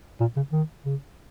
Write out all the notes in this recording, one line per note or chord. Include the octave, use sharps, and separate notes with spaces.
A#2
C#3
D#3
C#3